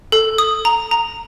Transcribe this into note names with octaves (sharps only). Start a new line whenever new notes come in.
A4
D#6
A#5
A#5